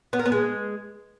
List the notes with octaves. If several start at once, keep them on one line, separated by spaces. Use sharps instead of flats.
B3
A#4
B3
G#3